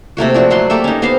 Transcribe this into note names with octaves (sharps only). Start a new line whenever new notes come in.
C3 A3 A#3 F#4
F3 D4 F#4
F#3 A3 F#5 C6
A#3 G4 A4 E5
C#4 D#4
B3 G4 C5 F5